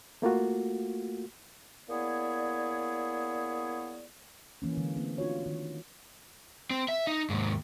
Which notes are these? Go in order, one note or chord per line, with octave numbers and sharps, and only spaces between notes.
A3 A#3 F4 F#4
A#3 B3 E4 G#4 C#5 D5
E3 A#3 C#4
D3 E3 G#3
A3 A#3 C4
D4 F4 F#4 C#5
D#3
C4
E5
D#4
D#2 G#2